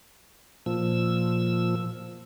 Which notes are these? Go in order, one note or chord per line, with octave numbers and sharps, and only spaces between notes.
A#2 F3 E6